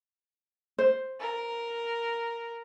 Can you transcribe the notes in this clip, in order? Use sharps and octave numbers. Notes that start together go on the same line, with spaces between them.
C5
A#4